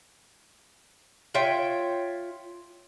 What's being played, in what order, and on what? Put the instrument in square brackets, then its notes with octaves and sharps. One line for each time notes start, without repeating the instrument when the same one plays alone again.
[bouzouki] F4 C#5 E5 G5